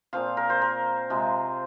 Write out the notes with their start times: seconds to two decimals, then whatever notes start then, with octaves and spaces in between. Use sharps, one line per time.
0.13 A#2 F3 C4 F5
0.37 A#4
0.50 C5
0.62 A#4
1.10 C3 F3 G#3 C4